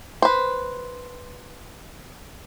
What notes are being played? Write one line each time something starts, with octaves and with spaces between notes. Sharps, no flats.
B4 C5